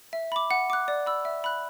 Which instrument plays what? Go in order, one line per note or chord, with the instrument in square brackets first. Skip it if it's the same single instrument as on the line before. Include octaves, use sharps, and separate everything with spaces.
[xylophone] E5
B5 D6
F#5
D6 F#6
D5
B5 E6
E5
B5 F#6